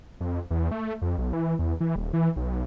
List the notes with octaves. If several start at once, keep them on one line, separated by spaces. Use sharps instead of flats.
F2
E2
A3
F2
B1
E3
E2
E3
D#1
E3
B1